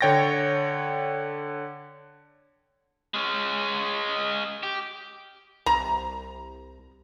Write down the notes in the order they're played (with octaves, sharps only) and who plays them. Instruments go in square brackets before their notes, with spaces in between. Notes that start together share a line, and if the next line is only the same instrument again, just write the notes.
[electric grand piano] D3 C#5 G5 A6 A#6
[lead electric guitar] G#3 C#4
G4
[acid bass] C2 [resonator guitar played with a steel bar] A#5